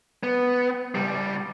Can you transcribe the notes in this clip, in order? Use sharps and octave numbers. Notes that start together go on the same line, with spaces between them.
B3
C#2 G3